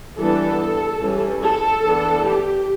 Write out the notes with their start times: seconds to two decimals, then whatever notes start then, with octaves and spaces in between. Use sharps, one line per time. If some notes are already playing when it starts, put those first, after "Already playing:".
0.18 E3 G3 B3 D4 A4
1.01 E3 G3 C#4
1.43 A4
1.84 E3 B3 D4
2.26 G4